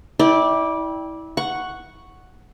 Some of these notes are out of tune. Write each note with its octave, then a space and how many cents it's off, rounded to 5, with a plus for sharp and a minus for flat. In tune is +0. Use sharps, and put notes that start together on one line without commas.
E4 -30 D5 +0 G5 +0
F#5 +0 C#6 +0